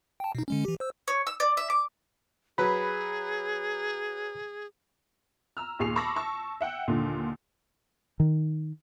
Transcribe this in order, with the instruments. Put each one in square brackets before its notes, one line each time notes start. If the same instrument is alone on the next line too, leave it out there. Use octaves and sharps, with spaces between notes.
[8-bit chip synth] G5 A5
B2 D#4
D3 G#3 C#4
E3 G4
C5 E6
[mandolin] C#5
E6
D5
E5
D6
[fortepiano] F#3 B4 [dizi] G#4 [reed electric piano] B5
[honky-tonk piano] A#5 E6 F6
D#2 A#2 G#4 C#6 C7 F7
A5 B5 C#6 D6 E6 A#6
A5 C#6 E6
E5 F#5 G5
D#2 A#2 D3
[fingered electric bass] D#3